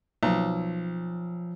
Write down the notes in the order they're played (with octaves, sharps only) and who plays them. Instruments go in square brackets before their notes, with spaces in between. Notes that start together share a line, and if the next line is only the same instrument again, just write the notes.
[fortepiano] B1 [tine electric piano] F3